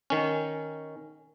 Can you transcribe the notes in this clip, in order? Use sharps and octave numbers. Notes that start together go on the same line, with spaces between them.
D#3 C#4